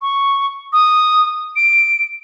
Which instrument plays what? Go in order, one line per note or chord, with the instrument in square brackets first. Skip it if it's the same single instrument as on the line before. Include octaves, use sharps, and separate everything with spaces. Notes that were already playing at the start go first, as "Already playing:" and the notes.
[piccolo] C#6
D#6
D7